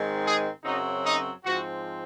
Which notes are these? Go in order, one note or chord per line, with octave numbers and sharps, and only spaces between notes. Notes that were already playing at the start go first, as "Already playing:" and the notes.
Already playing: G#2 D#3 G#3 C4
G#4
F#2 C#3 F#3 C4 D#4
D#4
G#2 F3 C4 F#4